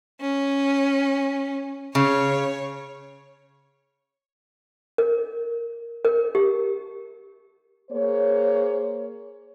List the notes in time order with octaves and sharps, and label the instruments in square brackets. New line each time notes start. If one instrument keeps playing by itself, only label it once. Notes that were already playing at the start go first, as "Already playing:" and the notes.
[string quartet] C#4
[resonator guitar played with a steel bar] C#3 [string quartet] C#5
[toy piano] A#4
A#4
G4
[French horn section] A#3 G#4 C5 C#5